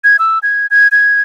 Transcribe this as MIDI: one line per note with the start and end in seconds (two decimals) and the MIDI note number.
0.04 0.17 92
0.19 0.39 88
0.43 0.66 92
0.71 0.88 92
0.92 1.21 92